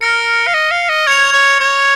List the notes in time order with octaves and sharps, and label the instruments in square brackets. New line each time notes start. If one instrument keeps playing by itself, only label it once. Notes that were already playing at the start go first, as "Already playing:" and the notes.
[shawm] A#4 [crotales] F6 A#6 C#7
[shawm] F5
D#5
F5
D#5
[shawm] C#5 [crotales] G#6 C#7 F7
[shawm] C#5
C#5